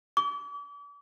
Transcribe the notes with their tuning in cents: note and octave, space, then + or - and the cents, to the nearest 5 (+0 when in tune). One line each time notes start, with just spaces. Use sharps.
D6 -40